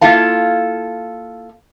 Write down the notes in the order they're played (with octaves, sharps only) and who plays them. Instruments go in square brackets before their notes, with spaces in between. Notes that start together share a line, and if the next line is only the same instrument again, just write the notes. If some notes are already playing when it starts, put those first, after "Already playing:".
[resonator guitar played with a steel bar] A#3 E4 F4 A4 F5 A5